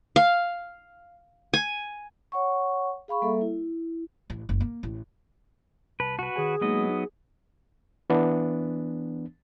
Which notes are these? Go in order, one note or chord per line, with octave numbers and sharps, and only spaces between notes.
F5
G#5
C#5 F#5 C#6
G#4 F5 B5 C#6
G3 A#3 A4 E5
E4
A1
F#1
A#3
A1
C2 B4 A5
F#4 B4
D#3 G#4 C#5 G#5
F#3 G#3 A#3 B3 D#4 D#5
D#4
E3 B3 D4